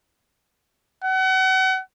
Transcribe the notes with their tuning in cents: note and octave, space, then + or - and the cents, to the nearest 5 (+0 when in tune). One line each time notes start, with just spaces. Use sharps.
F#5 +35